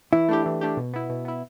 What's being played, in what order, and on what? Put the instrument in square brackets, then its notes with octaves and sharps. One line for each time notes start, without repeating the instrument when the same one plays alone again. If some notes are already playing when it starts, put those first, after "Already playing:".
[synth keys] E3 [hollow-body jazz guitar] E4
[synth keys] A3 D4 G4
E3
A3 D4 G4
B2
B3 E4
B2
B3 E4